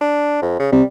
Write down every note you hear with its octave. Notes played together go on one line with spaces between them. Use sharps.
D4
F2
C#3
C3 G3